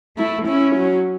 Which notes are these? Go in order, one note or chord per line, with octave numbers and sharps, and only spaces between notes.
A3 E4
C#4 E4
F#3